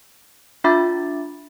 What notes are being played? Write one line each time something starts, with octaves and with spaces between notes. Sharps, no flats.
D4 F4 E5 B5 D6 A6